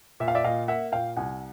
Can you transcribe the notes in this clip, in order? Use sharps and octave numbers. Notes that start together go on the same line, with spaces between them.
A#2 E5
F5
D5 E5
A#2 D#5 F5
A#3 E5 F#5
A#2 F5 G5
C2 F#5 G#5